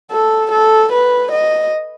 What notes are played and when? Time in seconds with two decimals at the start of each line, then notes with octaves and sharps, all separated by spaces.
0.11 A4
0.52 A4
0.92 B4
1.32 D#5